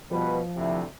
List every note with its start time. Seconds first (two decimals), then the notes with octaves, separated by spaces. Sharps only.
0.11 B2 F3 G3 B4
0.57 D2 C3 E4